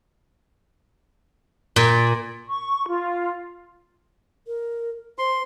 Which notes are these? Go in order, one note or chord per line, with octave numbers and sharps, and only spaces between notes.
A#2
C#6
F4
A#4
C5 C6